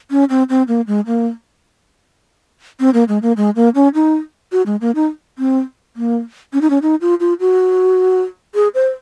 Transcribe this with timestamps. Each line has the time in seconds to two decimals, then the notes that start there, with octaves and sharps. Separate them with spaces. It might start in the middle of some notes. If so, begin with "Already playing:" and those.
0.11 C#4
0.30 C4
0.49 C4
0.68 A#3
0.87 G#3
1.06 A#3
2.80 C4
2.94 A#3
3.08 G#3
3.22 A#3
3.37 G#3
3.56 A#3
3.75 C#4
3.94 D#4
4.52 F#4
4.66 G#3
4.81 A#3
4.95 D#4
5.39 C4
5.96 A#3
6.53 C#4
6.61 D#4
6.70 C#4
6.82 D#4
7.01 F4
7.20 F4
7.40 F#4
8.55 G#4
8.75 C5